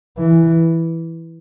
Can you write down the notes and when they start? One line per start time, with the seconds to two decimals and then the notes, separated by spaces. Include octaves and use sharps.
0.17 E3